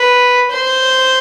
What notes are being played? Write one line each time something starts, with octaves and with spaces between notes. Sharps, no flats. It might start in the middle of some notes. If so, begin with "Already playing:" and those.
Already playing: B4
C5